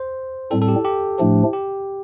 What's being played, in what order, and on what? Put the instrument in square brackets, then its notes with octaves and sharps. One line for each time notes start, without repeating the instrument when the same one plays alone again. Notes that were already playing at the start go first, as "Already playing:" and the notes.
Already playing: [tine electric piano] C5
[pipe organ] A2 G3 C4 [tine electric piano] A4
[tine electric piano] A4
G4
G4
[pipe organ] A2 F3 A3 D4
[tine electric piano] G4